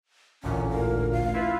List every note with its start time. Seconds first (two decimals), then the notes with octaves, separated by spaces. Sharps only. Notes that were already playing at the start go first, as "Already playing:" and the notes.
0.43 A1 D2 A#2 C#4
0.70 A#4
1.12 F5
1.34 E4 F4 B4